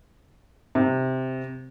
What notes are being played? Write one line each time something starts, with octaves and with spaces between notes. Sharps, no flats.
C3